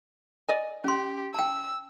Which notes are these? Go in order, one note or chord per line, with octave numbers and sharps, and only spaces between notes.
D5 D#5 G#5
C#4 G4 C6
G5 A5 E6